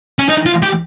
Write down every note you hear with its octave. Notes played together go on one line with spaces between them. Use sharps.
C#4
D#4
F4
G4